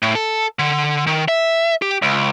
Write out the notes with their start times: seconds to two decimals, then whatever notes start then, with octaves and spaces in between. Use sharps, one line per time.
0.02 A2
0.15 A4
0.59 D3
1.07 D#3
1.28 E5
1.82 G4
2.02 C#2